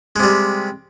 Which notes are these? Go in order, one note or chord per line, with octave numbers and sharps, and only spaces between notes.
C3 G3 G#3